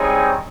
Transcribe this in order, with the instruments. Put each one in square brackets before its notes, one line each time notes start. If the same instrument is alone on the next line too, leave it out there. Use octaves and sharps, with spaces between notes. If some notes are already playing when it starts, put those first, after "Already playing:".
Already playing: [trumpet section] G3 C4 D#4 G#4 C#5